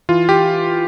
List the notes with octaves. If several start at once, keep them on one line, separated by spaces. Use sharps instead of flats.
E3 F4
G4